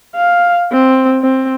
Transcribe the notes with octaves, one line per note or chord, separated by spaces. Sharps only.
F5
C4
C4